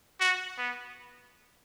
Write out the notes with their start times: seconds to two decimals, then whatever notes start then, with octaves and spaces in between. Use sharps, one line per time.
0.20 F#4
0.58 B3